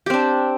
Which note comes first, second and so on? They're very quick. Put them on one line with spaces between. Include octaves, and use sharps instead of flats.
G4 C4 D4